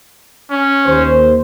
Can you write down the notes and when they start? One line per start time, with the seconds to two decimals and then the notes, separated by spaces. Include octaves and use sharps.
0.51 C#4
0.86 D#2 C5